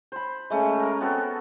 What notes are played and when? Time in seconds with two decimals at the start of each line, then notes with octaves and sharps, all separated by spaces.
0.12 C5 B5
0.50 G#3 A3 C#4
0.79 A#4 A#5
1.01 B3 C4 F#4 A4